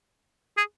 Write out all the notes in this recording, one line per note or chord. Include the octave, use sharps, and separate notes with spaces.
G#4